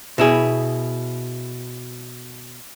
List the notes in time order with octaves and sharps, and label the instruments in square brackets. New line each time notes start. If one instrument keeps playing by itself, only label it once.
[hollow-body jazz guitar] B2 E4 G#4